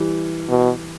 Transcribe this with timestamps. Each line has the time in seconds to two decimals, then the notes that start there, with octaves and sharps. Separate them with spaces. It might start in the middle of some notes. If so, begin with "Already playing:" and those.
Already playing: E3 G3
0.49 B2